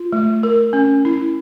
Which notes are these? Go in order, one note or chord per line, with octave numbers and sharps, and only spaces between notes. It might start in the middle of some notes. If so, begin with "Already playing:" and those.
Already playing: F4
A3
A#4
C#4
E4